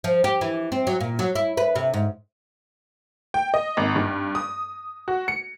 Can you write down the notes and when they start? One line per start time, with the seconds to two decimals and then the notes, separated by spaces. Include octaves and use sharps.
0.04 F3
0.24 G4
0.41 E3
0.72 C4
0.87 F#3
1.01 A#2
1.19 F#3
1.35 E4
1.57 B4
1.76 C3
1.94 G#2
3.34 G5
3.54 D#5
3.77 G#1
3.96 G2
4.35 D#6
5.08 F#4
5.28 C#7